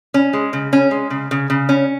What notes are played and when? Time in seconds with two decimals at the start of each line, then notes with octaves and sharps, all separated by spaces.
0.14 C#4
0.33 G#3
0.53 C#3
0.73 C#4
0.91 G#3
1.10 C#3
1.31 C#3
1.50 C#3
1.69 C#4